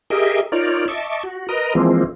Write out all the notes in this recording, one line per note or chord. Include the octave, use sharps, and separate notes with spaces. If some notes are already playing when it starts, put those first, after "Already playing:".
G4 G#4 A#4 D#5 E5
D#4 F4 A#4 C#5 D5
D#5 E5 A5 C#6 D6
F#4
A#4 B4 D#5 A#5
E3 F3 G#3 A#3 C4